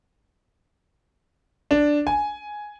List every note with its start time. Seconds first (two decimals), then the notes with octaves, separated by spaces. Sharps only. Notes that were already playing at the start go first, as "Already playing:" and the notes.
1.71 D4
2.07 G#5